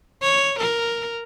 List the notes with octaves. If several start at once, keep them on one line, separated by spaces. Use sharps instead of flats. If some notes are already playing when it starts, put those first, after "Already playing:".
C#5
A#4